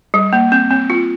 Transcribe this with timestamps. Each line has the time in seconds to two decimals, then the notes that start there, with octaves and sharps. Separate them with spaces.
0.14 G3
0.33 A#3
0.52 C4
0.71 C4
0.90 F4